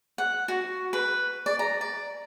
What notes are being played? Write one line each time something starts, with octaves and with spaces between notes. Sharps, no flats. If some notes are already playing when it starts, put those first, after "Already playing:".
F#5
F#4
B4
D5
A#5
D5